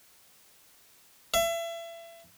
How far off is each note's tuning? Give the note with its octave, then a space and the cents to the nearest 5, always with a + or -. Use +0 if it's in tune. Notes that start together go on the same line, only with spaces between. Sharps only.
E5 +30